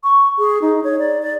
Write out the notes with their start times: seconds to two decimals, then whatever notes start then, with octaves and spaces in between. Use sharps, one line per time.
0.04 C#6
0.39 G#4
0.62 D#4
0.84 C#5
0.99 D5
1.22 D5